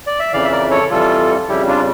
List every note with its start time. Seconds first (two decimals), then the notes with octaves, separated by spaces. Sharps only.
0.07 D5
0.19 E5
0.33 F2 C#3 E3 D5 F5
0.45 E5
0.52 A#4 D5
0.71 A4 C#5
0.90 F2 E3 G3 F4 A4
1.48 F2 C#3 G3 E4 G4
1.67 D4 F4